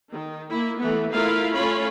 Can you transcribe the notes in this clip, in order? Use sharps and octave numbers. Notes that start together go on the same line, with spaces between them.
D#3
A#3 E4
E3 A3 B3
A3 E4 F4 A#4 F5
A3 C#4 F4 C#5 B5